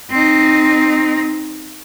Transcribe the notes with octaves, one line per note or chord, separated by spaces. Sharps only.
C4 D#4